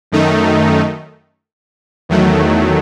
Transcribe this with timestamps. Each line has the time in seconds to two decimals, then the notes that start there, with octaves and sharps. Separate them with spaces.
0.12 F#2 D#3 A3 D#4
2.09 E2 D#3 F#3 A3